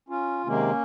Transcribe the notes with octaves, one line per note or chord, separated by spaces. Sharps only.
C#4 F4
C3 D#3 G#3 A#3 C#4